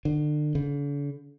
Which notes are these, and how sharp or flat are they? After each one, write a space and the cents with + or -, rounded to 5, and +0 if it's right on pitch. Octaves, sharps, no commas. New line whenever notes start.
D3 +35
D3 -45